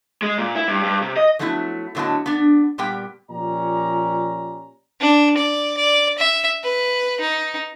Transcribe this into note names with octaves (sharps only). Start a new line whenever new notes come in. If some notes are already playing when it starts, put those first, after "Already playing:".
G#3
A#2
E4
G2
G2
C3
D#5
F3 F#3 A3 B3 D#4 E4
A2 D3 F#3 B3 D#5 A5
B3 D4
A#2 G3 B3 G4 G5
A#2 F3 C#4 G4 D5 A#5
D4
D5
D5
E5
B4
D#4